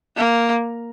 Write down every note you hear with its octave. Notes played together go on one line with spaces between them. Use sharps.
A#3